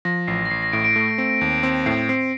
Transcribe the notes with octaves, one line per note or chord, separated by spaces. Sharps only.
F3 A#6
A1 C7
A#6
A1 C7
A#6
A2 D7
D7
A3
C4
D#2
C4
A2 C7
C4 C7